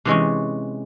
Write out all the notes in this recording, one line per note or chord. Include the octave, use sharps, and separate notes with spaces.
C3 E3 G#3 C#4